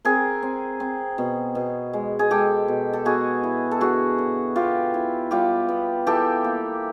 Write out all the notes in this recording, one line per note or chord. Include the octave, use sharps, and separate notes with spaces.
C4 G#4 A#4
C4
C4
B2
B2
G#3
G#4
G#3 G4 A4
B2
A4
B3 F#4 G#4
E4
A4
D3 F#4 G#4
D3
B3 F4 G4
E4
G3 F4 G4
B3
E3 G4 A4
A#3